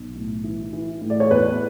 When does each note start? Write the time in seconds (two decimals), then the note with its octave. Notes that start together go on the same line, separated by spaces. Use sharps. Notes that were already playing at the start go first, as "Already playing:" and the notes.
Already playing: B1
0.15 A2
0.44 E3
0.73 E3
1.02 A2
1.10 D5
1.20 C#5
1.31 E2 B4